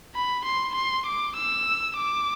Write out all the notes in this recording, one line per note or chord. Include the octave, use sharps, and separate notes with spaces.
B5
C6
C6
D6
E6
D6